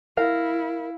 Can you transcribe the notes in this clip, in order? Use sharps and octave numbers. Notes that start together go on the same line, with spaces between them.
E4 A#4 F5 A#6